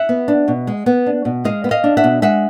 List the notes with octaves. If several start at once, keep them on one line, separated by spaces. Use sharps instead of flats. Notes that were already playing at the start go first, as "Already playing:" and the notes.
Already playing: E5 F#5
B3
D4
B2
G#3
B3
D4
B2
G#3 D#5 F5
B3
D#5 F5
D4
E5 F#5
B2
G#3 E5 F#5